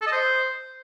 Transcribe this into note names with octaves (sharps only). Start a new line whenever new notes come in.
A4
D#5
C5